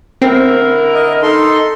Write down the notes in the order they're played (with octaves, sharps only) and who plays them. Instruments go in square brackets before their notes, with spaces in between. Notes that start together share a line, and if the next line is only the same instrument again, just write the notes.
[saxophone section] D3 E4 A#4 [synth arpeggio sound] C4
[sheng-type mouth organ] D#5
D#4 A4 C6